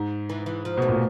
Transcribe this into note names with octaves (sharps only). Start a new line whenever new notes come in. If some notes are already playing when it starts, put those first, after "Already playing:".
Already playing: G#2
E3
E3
F3
B2 A3
A#2